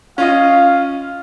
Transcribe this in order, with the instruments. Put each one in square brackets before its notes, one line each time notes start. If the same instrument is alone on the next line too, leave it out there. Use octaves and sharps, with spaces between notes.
[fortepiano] C#4 F4 D#5 [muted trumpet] F5